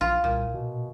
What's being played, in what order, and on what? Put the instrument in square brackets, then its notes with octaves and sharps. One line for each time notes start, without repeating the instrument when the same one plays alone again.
[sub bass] A#1 [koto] F4
[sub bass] C2 [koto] A#2
[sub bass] B2